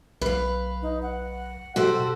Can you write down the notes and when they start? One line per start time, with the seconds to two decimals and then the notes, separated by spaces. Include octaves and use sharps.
0.21 B1 B4 F5
0.82 D#4
1.02 F#5
1.76 B2 F#4 G4 A4 C5